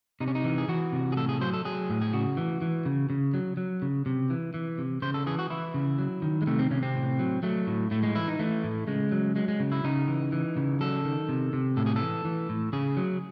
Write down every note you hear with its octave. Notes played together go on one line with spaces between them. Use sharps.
C3 D#4
C#4
D#4
E3
G#4
E3 F#4
C3
G#4
A2 A4
G#4
F#3 C5
A4
F#3 G#4
A2
G#4
C#3 F#4
E3
E3
C#3
C#3
F#3
F#3
C#3
C3
E3
E3
C3
C#3 C5
A4
E3 G#4
F#4
E3 E4
C#3
F#3
D#3
G#3
C3 A3
C4
C3 C#4
C4
A2
F#3
F#3 A3
A2
A2 A3
G#3
E3 E4
D#4
E3 A3
A2
C#3 G#3
F#3
F#3 G#3
G#3
C#3
E4
C#3 D#4
E3
E3
C#3
F#3 A4
D#3
C3
C3
A2 A4
G#4
A4
E3
E3
A2
C#3 G#4
F#3